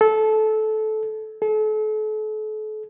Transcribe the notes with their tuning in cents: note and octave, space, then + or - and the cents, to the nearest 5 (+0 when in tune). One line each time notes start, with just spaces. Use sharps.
A4 -20
A4 -40